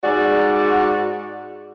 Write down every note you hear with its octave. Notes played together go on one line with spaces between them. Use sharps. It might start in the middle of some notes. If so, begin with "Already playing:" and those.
G#2 F#4 D5